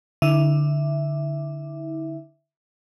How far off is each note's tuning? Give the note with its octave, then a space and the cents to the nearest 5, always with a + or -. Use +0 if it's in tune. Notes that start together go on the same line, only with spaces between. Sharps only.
D3 +0 E4 -35 E5 +0